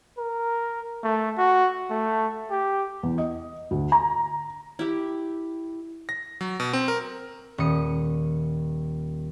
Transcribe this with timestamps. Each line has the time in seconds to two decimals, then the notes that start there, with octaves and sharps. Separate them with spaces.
0.18 A#4
1.03 A3
1.38 F#4
1.90 A3
2.50 G4
3.03 E2
3.18 D#5
3.71 D2
3.92 A#5
4.79 E4 G4
6.09 A#6
6.41 F#3
6.60 B2
6.73 C4
6.88 A#4
7.58 D#1 D#6 C#7